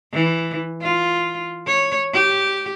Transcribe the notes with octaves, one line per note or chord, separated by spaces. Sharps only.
E3
F4
C#5
G4